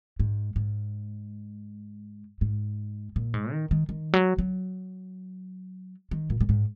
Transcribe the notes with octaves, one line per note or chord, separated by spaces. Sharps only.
G#2
G#2
G#2
A#2
G#2
D#3
D#3
D#3
F#3
F#3
D#3
A#2
A#2
G#2